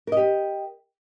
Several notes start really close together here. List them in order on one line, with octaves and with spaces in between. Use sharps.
A#4 D#5 G4